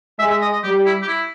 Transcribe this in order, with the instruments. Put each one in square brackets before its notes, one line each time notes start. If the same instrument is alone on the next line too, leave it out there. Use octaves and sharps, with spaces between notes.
[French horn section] G#3 [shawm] E5
[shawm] E5
D#5
D#5
[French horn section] G3 [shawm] G4
[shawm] E4
G4
E4